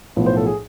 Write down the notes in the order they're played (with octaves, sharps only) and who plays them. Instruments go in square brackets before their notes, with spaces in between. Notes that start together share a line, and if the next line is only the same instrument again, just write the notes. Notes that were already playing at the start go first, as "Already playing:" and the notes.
[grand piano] B1 A2 F3 B3
C5
A4
G#4